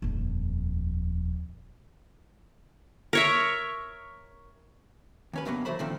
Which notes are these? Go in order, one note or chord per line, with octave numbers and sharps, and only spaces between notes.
D#1 F2
A#4 C#5 E5
D#2 C#4 B4
D2 G2 B2 F#3 A#3 B3
E3 F#3 A3 C5 B5
A#2 D3 D#3 F3 A3 C4